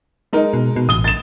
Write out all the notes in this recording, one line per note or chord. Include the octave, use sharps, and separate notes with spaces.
G#3 D#4 A#4
B2
B2
A1 D#6 G7
A6 E7